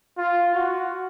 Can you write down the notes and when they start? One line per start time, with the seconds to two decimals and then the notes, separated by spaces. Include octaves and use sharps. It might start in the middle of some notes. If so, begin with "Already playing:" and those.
0.18 F4
0.55 F#4